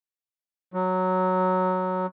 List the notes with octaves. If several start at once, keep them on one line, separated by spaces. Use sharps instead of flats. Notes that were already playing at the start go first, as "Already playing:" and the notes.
F#3